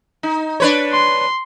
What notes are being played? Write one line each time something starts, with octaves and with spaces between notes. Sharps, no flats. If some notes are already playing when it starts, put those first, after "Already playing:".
D#4
D4 B4 C#5
C6